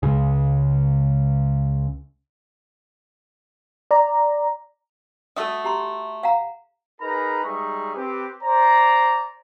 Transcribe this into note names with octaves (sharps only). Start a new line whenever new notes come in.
C#2 C#3
D5 A#5
A3 F#4 A4 E5 D#6
G4 A#5 C6
F5 F#5 A#5
D#4 G#4 A#4 B4 A#5 B5
G3 G#3 D#4 G#4 E5 C#6
C4 G4 B4
C5 D5 A#5